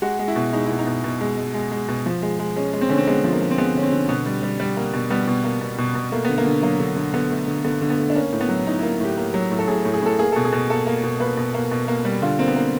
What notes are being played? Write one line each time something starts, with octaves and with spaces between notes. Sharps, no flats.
G#3 F#4
G#3
E4
B2
G#3 D#4
B2 E4
D#4
B2
B2
G#3
G#3
G#3
G#3
B2
F3
G#3
G#3
G#3 C#4
G#3
C4
D3 C#4
C4
G#3 B3
F3
A#3
F3
C4
G#3 B3
D3 C#4
C4
D3
B2 B3
G3
G3
G3
A#3
B2
G3 B3
B2
A#3
B2
B2
B2
A3 A#3
D3 B3
A#3
D3
F#3 A#3
D3
D3
D3 B3
A3
D3
D3 B3
D3
B3
A3
D4
A#3 C#4
A2
B3
F#3
A2 D#4
A#3 E4
A2 G4
A#3
F#3
A2
A4
A2 G#4
A2
G#4
A2 A4
A#3 G#4
B2 A4
G#4
B2
A#3 A4
A#3
B2
A#3 B4
B2
A#3
B2
A#3
G3
D3 F4
A#3 C4
B3
A#3